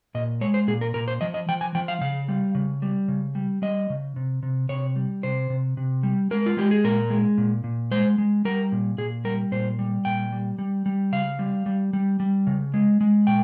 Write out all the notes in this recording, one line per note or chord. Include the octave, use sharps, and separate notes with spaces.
A#2 D#5
G#3 C#5
C5
A#2 G#4
A#4
A#2 A#4
C5
F3 D#5
D#5
F3 G5
G#5
F3 G5
F5
C#3 F5
G3
C#3
G3
C#3
G3
G3 D#5
C#3
C3
C3
C3 C#5
G3
C3 C5
C3
C3
G3
G#3 A#4
F4
G#3 G4
G#4
A#2 A#4
G#3
A#2
A#2
G#3 C5
G#3
G3 A#4
A#2
A#2 G#4
G3 A#4
A#2 C5
G3
A#2 G5
G3
G3
G3
C#3 F5
G3
G3
G3
G3
C#3
G#3
G#3
A#2 G5